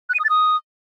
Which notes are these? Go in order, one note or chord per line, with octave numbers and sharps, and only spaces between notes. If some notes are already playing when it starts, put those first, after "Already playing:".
F#6
D#7
D#6
A6
D#6